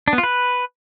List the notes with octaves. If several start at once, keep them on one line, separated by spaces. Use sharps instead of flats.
D4
B3
F4
B4